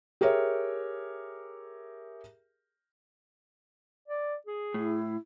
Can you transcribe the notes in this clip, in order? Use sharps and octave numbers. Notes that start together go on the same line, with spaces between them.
G4 G#4 A#4 C#5 E5
D5
G#4
A2 E4